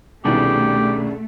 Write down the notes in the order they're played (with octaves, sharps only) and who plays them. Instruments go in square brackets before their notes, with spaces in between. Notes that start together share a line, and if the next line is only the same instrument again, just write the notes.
[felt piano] C2 B2 D#3 [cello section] A3 [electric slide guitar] C#4 D4 G#4 [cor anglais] G4